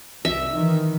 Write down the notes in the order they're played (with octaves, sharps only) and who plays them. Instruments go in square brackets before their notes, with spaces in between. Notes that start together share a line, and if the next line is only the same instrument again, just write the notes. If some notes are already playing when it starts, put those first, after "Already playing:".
[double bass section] C2 [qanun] E5
[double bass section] D#3 E3